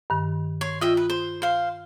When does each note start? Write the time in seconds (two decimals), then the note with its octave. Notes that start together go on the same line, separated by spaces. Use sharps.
0.10 G2 D#3
0.61 C#5 C6
0.81 F4 D#5 E5 G5
0.97 B4
1.10 C5
1.42 C5 F5